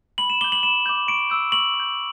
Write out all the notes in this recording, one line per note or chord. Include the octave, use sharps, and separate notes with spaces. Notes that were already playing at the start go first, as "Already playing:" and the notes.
B5 F#7
E7
D6 G6 G7
F#7
B5 E7
D6 G6
C#6 D7
E6 G6
C#6 F#7
E6
G6